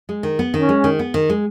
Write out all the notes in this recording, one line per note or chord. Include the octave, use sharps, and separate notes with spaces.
G#3
D#3
B3
D#3 C#4
G#3
D#3
B3
D#3
G#3